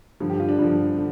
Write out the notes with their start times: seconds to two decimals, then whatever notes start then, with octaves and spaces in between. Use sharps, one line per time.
0.20 G2 D3 F3
0.30 G4
0.40 F4
0.49 D4
0.59 G2 D3 F3
0.97 D3